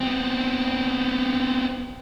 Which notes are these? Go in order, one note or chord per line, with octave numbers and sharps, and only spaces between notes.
B3 C4